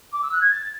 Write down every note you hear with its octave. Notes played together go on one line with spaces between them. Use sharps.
D6
E6
F#6
G#6
A6